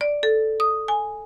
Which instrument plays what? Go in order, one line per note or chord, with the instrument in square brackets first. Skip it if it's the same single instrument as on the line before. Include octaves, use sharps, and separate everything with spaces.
[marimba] D5
A4
D#6
G#5